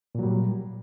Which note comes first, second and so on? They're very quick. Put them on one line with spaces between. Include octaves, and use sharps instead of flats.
A#2 F#3 G3